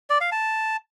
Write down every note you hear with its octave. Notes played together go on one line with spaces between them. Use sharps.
D5
F5
A5